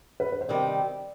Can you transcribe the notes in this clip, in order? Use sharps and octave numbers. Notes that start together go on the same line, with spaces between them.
B4
B4
C5
C3 D#3 G3 D5